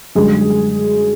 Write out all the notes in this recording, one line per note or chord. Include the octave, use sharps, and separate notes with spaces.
F#2 D3 G3 G#3 G#4